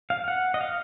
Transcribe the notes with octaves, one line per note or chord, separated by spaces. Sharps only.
F5
F#5
D#5
F5